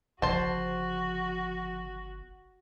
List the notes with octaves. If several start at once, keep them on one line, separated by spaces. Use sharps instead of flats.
G1 C#3 F3 F#4 C5 A5